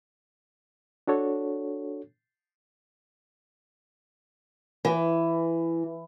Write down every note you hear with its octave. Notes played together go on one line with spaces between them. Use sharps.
D4 F#4 A4 C#5
E3